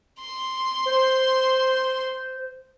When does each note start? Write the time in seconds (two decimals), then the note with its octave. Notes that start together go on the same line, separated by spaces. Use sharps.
0.21 C6
0.86 C5